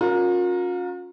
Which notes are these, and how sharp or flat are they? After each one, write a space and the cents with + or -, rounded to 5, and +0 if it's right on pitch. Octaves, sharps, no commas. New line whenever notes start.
C#4 +5 F4 +45 A#4 +0